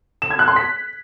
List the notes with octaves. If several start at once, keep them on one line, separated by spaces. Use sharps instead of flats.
E7
G#6
F#6
C6
B6